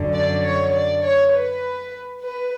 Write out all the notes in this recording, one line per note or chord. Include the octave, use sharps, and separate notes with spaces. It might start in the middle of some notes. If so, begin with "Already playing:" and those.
Already playing: F#2 D3
D5
C#5
D5
C#5
B4
B4